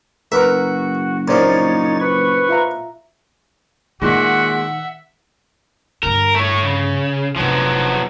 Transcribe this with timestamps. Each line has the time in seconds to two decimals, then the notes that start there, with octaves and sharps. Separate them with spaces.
0.32 F#1 F#4 A#4 B4 E5
1.28 A#1 F3 D#4 A#4 C#5 D5 A6
2.00 B4 C#6
2.49 F4 E5 A#5
4.02 A#2 D#3 G#3 F#4 E5 F#5
6.03 G2 D3 A#4
6.35 A3 C#5
6.62 C#3
7.36 F1 F3 F#3 B3 D4